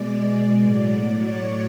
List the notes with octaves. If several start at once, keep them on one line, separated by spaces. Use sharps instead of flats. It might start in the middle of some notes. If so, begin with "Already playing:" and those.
Already playing: B2 G#3 D5
A2 F#3
C#5